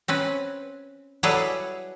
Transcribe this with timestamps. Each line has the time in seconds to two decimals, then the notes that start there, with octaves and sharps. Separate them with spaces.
0.08 C4 C#4 B4
1.23 F#3 G3 E4 G#4 A4 B4